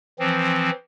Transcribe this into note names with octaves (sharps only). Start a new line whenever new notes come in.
E3 F3 C4